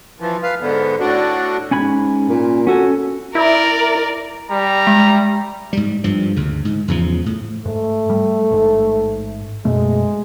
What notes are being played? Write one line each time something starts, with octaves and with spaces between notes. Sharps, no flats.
E3 F3
B4 F5
G#2 D3 B3
A2 D4 F#4
G#2 C#4 G#5 B5
A#2
C#4 F#4 A4 G#5
E4 A#4 D5
G3 A#5
G#3
G#2 G3
G2 F3
D2 C#3
G#2
E2 C#3 F3
A2
G#2 A3
G3
A1 G#2
F#2 B2 G#3 A3